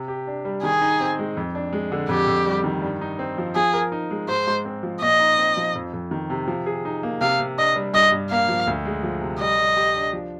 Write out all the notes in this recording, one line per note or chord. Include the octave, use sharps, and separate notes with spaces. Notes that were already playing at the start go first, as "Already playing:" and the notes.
Already playing: C3
G4
D4
G3
D#3 G#4
D#4
C4
G#3
F2
D4
G#3
D3
F2 G4
F2
G3
D#3
G2
D#4
C4
F3
F3 G#4
A#4
D#4
G#3
G#2 C5
G#2
C4
F3
A#2 D#5
D#4
C4
F3
F2
F2
D#3
C3
F3
G#4
D#4
A#3
C3 F5
C3
D4 D#5
G3
G2 D#5
G2
A#3 F5
F3
D2
G#3
F3
C3
G3 D#5
G3
G4
D4
F3